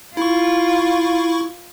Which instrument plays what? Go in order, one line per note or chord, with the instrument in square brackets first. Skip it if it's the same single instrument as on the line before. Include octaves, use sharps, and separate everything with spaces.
[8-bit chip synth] E4 C#6 [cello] F4